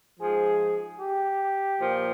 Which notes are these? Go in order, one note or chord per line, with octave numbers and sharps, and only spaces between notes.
G#2 F3 G#4
G4
A#2 F3